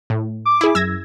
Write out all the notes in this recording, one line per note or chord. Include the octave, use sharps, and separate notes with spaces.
A2
D6
E4 G#4
F#2 E6 G#6 A#6